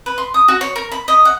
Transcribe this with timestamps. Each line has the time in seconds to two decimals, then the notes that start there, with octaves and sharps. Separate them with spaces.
0.06 B4
0.18 C6
0.34 D#6
0.48 F#4
0.61 C#5
0.76 A#4
0.92 B5
1.08 D#5
1.25 F#5